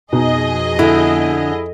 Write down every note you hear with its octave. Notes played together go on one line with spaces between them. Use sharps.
F2 B2 D#4 G#4 D#5
D3 E4